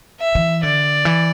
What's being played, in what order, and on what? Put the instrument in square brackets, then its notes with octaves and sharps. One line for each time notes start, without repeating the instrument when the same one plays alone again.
[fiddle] E5
[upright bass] E3
[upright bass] D3 [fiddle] D5
[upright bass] E3